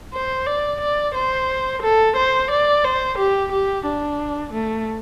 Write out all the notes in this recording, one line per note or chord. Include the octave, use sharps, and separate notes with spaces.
C5
D5
D5
C5
A4
C5
D5
C5
G4
G4
D4
A3